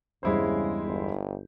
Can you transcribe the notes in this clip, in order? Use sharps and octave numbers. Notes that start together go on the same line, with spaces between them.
E2 G2 C#3 G3 G#3 E4 C5
G1